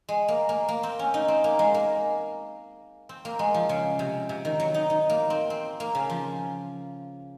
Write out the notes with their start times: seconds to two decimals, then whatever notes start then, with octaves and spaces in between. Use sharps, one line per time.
0.09 G#3
0.28 A#3
0.49 A#3
0.69 A#3
0.83 C4
0.99 C#4
1.14 D#4
1.28 C4
1.44 A#3
1.59 G#3
1.74 A#3
3.09 C4
3.25 A#3
3.39 G#3
3.54 F3
3.69 C#3
3.99 C3
4.29 C3
4.45 D#3
4.60 F#3
4.74 D#4
4.90 D#4
5.09 A#3
5.30 C4
5.50 C4
5.80 A#3
5.95 C#3
6.10 F3